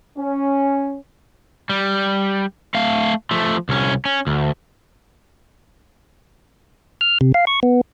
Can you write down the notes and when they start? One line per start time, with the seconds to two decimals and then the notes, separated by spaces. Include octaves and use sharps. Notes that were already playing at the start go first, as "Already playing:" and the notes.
0.17 C#4
1.70 G3
2.75 A3 F5
3.31 F3 A3
3.69 C2 C#4
4.05 C#4
4.27 D2
7.01 F6
7.21 C3
7.34 F5
7.47 C#6
7.63 B3